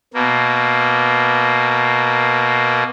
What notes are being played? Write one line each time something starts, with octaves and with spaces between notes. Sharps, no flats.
B2 A#3